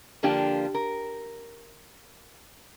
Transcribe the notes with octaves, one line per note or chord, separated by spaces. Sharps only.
D3 F3 A#3 D4 F4 G4
A#4